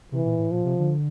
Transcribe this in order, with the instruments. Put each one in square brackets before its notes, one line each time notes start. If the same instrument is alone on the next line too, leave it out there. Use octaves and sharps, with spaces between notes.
[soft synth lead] C3 [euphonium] E3
[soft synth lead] A#2
A2
[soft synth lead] A#2 [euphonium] F3
[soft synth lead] C3
D3